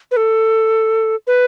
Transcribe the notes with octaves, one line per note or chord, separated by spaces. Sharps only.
B4
A4
B4